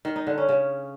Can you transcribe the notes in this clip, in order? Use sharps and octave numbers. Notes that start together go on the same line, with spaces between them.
D#3
D#4
D3
C#4
C#3